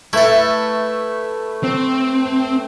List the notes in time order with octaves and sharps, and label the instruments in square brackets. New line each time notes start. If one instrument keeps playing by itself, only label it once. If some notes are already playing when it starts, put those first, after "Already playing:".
[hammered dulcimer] A3 B4 [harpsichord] E4 A4
[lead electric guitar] C4